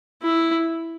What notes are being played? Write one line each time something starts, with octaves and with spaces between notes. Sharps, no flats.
E4